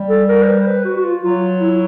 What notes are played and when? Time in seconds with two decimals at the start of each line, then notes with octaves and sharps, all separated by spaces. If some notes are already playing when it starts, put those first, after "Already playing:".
Already playing: G3
0.09 A4
0.28 A#4
0.42 C5
0.47 B4
0.58 C5
0.67 B4
0.85 F#4
0.96 F#4
1.04 F4
1.23 F#3 F4
1.61 E4